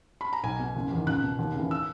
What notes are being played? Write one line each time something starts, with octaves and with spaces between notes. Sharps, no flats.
B5
A#5
B1 G#5
B2
F#1
E2 D#3
C#2 F#6
B2
D#2
C#3 E3
E6